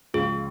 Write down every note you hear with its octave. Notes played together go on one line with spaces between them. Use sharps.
C#2 C#3 F3 G#4